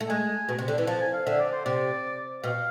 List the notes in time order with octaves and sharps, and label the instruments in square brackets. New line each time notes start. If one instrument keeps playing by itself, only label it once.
[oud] A3
[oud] G#3 [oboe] G#5
[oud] B2
C3
D3
E3
[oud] F3 [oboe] A5
[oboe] G#5
F5
[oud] D3 [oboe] E5
[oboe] D5
C5
[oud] C3 [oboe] D5
[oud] B2 [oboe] F5